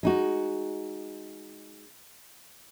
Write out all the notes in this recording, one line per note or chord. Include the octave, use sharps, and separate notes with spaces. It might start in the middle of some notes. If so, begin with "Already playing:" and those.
G#3 D#4 F#4